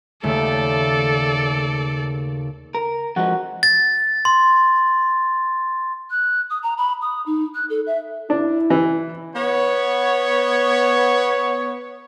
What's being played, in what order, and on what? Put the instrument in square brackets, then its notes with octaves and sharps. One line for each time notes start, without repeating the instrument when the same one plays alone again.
[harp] D#2 C#3 A3 [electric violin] A4 D5
[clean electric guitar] A#4
[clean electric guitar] F2 F3 G#3 [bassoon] F#4
[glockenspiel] A6
C6
[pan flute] F#6
D#6
A#5
B5
D#6
D#4
F#6
A4
E5
[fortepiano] D4 [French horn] E4
[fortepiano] E3
[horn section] B3 C#5